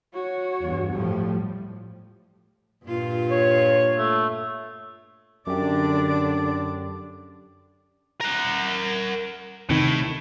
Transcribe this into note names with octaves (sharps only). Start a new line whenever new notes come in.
F#4 C#5
E2 G2
A2 F3 G3
G2 A#2 F4
C#5
A3
F#2 D3 D4 G4 D5 D6
A#4 F#5
A2 C3 D#3